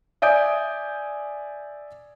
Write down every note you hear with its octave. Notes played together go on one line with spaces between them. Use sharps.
D5 E5 G#5 D#6 G6 D7